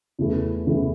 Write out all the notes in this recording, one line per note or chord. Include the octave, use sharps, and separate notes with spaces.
E2 E3 A3 E4
E2 E3 A3 E4